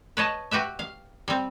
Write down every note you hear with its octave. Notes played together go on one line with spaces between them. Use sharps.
B4 C#5 D#5 A5
F#4 G4 B4 E5
F5
G3 C4